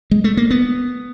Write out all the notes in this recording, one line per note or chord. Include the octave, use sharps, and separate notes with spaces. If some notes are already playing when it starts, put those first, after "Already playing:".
G#3
A3
A#3
B3